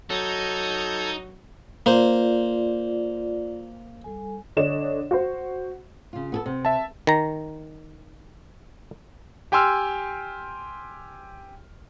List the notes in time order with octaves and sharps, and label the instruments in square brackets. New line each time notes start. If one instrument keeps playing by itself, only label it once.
[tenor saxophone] F#3 [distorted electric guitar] D#4 [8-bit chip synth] A4 G6 G#6
[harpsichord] A#3 C5 [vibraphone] F4 D5
[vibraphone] G3 A4 G#5
[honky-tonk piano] D3 D4 C#5 D#5 E7
F#4 C5
[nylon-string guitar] C#3 F4
B3 G#4 A4
C3
[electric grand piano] E5 A5
[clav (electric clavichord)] D#3 A#5
[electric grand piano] G4 G5 G#5 C6 E6 F6